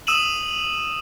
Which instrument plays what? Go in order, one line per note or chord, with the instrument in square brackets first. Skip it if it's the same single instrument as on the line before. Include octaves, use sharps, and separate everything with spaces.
[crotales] D#6 E6 D#7 E7 F#7